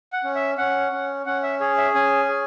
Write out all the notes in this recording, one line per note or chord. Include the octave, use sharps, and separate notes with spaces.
F#5
C#4
E5
C#4 F#5
C#4
C#4 F#5
E5
G#4 C#5
E5
C#4 G#5
G#4